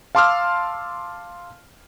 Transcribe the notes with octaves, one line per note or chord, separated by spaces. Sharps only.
F5 A5 C6 D6 E6 F6